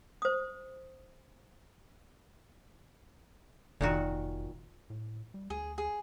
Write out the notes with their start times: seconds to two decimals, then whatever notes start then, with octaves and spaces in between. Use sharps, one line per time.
0.22 C5 D#6
3.81 F1 A#2 D#3 F#4
4.90 A2
5.34 G3
5.50 D2 G#4
5.78 G#4